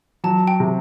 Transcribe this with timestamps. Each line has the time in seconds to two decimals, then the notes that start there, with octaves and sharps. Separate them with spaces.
0.24 F#3 A5
0.48 G5
0.60 C3